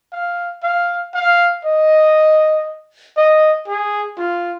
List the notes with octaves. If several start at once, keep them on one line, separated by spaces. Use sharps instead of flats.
F5
F5
F5
D#5
D#5
G#4
F4